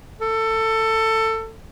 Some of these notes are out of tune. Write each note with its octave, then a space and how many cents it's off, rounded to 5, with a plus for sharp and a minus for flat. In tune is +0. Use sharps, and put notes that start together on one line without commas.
A4 +20